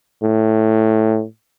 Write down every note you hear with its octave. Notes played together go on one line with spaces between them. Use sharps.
A2